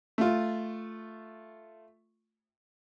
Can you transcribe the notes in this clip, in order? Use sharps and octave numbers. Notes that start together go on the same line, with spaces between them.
A3 F4